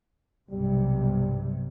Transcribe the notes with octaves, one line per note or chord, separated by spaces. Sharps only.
B1 G2 C3 G3